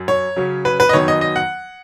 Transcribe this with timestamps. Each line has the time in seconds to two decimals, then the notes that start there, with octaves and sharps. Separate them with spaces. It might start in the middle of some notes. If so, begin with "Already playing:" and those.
Already playing: F#2 F#3
0.08 C#5
0.36 C#3 F#3 C#4
0.65 B4
0.80 B4
0.89 D#5
0.93 F#2 D#3 F#3 B3 D#4 C#5
1.08 D#5
1.21 D#5
1.36 F#5